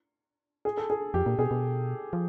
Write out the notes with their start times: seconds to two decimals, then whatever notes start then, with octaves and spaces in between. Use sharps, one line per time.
0.65 G#4
0.77 A4
0.90 G#4
1.14 F2 G4
1.26 A#2
1.39 B2 G#4
1.51 B2
2.13 F3